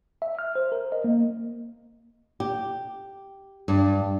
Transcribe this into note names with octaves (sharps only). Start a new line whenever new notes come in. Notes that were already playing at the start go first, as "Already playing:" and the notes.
E5
F6
C5
A#4
D#5
A#3
G4
G2